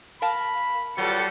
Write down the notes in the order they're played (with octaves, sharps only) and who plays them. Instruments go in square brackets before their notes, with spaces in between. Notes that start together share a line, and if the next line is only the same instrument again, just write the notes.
[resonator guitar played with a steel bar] A#4 F5 A5 [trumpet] B5
[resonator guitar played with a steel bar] F#3 F4 [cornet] G3 [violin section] F#4 A4 C#7 [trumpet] B4